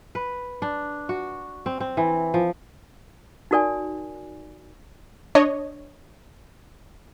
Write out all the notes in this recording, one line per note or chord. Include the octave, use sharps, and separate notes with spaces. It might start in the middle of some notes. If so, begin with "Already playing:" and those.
B4
D4
F#4
C4
C4
E3
F3
D#4 F#4 A#4 D5 G#5
D4 C#5 D#5